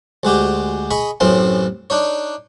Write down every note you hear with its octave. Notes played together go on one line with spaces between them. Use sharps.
D2 G#3 F#4 G4
G#4 D#5 B5 C#6
A1 F#2 A2 E3 C4 C6
D4 D#4 C#5